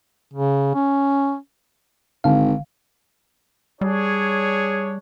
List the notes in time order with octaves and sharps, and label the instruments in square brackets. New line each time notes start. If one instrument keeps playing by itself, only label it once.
[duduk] C#3
C#4
[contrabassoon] G#1 [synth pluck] D3 F5
[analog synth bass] G3 [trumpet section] D4 G#4 C#5